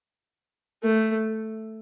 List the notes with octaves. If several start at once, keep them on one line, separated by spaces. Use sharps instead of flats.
A3